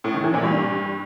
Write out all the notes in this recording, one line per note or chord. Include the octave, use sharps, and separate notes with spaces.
A2
D#3
E3
A#2
G2